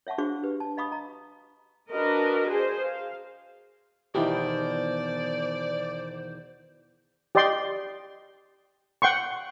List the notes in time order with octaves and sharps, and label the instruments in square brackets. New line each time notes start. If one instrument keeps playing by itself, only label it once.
[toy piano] C#5 E5 F#5 A5 C#6
D4 F#4 G#4 C5 F5 C#6
G4 B4
A5
D#5 F5 B5 C#6 D#6
D#5 A#5
[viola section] D4 F#4 A#4 B4 D#5
G#4 C5
F5
[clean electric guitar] E2 B2 D#3 [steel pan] D#4 E4 G4 [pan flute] C5 [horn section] D5
[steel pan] G4 D5 D#5 G5 C6
F#5 G5 C6 C#6